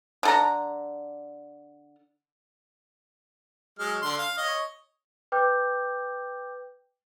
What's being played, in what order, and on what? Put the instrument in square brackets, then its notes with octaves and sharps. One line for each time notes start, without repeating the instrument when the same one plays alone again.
[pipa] D3 A4 A#5
[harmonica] F#3 G#3 F6
D3 C6
F5
C#5 D#5
[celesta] B4 G5 D6 G6